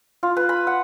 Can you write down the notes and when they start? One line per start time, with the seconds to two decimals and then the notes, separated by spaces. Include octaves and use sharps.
0.23 F4
0.37 B4
0.49 B5
0.67 F#5